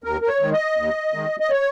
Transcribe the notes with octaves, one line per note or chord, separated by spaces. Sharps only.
D#2 A#4
A#4
C#5
D#3 G#3
D#5
D#2
D#3 G#3
D#5
C#5